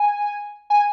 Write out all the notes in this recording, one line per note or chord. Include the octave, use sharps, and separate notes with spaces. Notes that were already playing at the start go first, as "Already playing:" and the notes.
Already playing: G#5
G#5